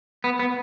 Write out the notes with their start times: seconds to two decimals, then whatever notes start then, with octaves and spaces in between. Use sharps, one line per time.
0.24 B3
0.39 B3